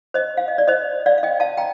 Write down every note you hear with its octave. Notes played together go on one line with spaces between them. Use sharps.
C5 D#5
F5
D#5
D5
C5 D#5
D5 F5
F5
D#5 G5
F5 A5
G5 A#5